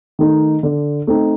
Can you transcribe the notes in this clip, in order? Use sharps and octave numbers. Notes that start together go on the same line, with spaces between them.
D#3 A3 D#4
D3
A3 C4 D#4